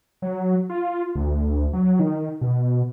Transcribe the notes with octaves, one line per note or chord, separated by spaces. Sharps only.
F#3
F4
D2
F#3
D#3
B2